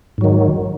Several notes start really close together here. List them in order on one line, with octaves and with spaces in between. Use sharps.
G#2 F#3 D#3